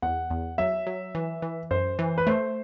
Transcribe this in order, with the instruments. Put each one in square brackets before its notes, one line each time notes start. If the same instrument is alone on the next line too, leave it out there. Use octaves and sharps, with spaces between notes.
[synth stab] E2 [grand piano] F#5
[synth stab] E2
[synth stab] F#3 [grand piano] E5
[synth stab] F#3
E3
E3
[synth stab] F#2 [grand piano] C5
[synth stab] E3
[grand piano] B4
[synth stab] A3 [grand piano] C5